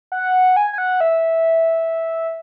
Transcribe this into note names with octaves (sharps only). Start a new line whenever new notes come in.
F#5
G#5
G#5
F#5
E5